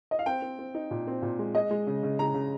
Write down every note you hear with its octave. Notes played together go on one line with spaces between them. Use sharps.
D#5
F5
C4 G5
C4
C4
D#4
A#2
C4
A#2
G#3
G#3 D#5
G#3
C#3
C#3
C#3 A#5
C#3